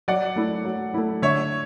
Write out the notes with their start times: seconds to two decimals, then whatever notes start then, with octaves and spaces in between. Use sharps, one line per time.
0.08 F#3 D5 F#5
0.36 A3 E4
0.65 F#3
0.94 A3 E4
1.22 D3 C#5 E5